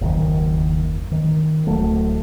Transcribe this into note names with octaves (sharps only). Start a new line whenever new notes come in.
F#1 D#2 D#3
D#3
D1 F#3 A3